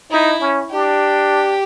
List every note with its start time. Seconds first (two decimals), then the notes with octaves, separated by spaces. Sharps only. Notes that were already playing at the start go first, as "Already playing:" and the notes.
0.11 D#4 E4
0.41 C#4
0.71 D4 G4